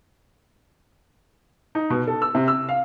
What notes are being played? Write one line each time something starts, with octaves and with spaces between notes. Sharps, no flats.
D#4
B2
A4
E6
C3
E6
F5